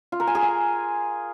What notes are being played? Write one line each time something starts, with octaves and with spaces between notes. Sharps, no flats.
F4
A#4
G#5
G#4
G#5